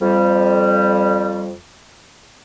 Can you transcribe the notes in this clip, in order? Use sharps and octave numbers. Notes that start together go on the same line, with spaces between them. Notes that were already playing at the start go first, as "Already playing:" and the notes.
F2 G3